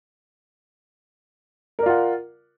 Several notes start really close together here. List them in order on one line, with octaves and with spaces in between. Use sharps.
A#4 D5 F4 F#5